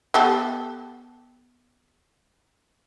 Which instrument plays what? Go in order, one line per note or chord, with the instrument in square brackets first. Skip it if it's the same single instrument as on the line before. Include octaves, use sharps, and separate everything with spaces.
[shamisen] B3 G4 A4